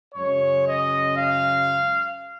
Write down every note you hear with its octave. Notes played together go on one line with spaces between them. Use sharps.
F#2 C#3 G#3 C#5
D#5
F5